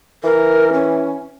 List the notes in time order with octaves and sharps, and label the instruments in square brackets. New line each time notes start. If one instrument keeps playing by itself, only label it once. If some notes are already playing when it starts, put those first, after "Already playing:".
[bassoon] E3 [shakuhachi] A#4
[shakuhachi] C#4